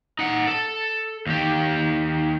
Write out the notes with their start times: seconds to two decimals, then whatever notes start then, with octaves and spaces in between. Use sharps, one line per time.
0.19 D#4 F#5
0.47 A4
1.27 D#2 G4